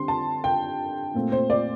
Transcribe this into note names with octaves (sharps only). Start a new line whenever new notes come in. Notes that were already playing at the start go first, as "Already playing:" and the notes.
Already playing: D3 G3 C4 C6
A5
G5
A#2 A3 C4
C5
D5